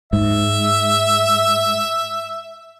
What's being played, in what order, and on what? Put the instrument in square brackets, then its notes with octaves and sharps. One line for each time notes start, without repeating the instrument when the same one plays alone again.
[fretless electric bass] G#2 [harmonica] E5